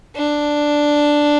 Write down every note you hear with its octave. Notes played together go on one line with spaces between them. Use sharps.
D4